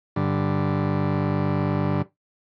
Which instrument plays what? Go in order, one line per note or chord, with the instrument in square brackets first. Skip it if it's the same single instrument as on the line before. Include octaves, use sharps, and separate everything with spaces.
[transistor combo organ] G2 D3